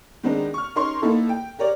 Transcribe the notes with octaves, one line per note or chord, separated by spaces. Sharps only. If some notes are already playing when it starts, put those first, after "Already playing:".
D#3 G#3 B3 C4 D4 D#4
C#6 F6
C#4 D#4 A#4 C#5 C6 C#6
A#3 B3 D#4 E4 A4
G5
G4 A#4 C#5 D5